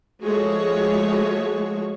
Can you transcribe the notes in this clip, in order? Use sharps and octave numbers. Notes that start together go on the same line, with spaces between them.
F3 G#3 A3 F#4 G#4 C#5